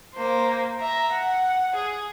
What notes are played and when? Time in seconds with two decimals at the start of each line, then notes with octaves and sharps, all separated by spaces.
0.15 A#3 C5
0.80 E5 A#5
1.12 F#5
1.75 G#4